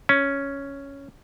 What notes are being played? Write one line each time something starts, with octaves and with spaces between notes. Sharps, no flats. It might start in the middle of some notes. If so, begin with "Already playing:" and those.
C#4